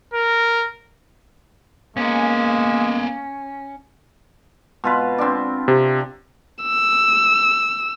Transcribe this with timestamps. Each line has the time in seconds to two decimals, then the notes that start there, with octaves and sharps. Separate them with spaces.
0.14 A#4
1.97 G#3 A#3 B3 C#4 A#4
4.84 B2 F4 B4
5.18 C4 D4
5.68 C3
6.63 E6